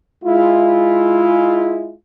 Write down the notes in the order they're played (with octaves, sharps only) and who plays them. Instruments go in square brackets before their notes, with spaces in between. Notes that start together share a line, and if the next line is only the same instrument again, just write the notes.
[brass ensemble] G#3 E4 F4